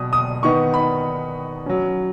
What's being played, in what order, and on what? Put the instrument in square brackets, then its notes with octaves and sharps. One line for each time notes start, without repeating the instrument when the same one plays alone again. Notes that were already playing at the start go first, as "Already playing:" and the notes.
Already playing: [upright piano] B2 F#3 D#6
D#6
D#3 B3 D#4 C#6
B5
F#3 C#4